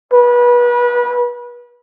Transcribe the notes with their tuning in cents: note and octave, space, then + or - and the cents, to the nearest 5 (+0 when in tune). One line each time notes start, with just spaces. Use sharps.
B4 -30